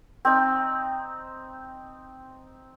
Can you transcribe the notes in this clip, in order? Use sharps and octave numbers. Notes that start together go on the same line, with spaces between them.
C4 D#4